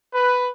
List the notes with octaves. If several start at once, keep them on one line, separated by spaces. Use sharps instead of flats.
B4